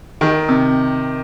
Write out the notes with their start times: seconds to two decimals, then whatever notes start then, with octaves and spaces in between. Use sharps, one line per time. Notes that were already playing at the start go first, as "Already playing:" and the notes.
0.21 D#3
0.49 C3